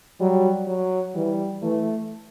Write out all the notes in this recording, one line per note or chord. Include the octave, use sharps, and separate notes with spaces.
F#3 G3
F#3
E3 G3
E3 A3